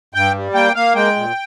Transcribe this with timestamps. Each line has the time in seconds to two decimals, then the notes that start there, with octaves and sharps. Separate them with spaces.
0.14 G2 G5
0.35 G3
0.54 A#3 G5
0.75 A#3 F5
0.95 G#3 G5
1.16 A#2